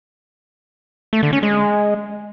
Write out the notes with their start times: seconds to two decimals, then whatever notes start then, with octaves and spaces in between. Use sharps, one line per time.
1.13 A3
1.23 D3
1.33 C#4
1.43 G#3